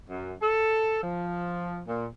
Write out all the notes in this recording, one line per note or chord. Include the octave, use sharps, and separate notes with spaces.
F#2
A4
F3
A#2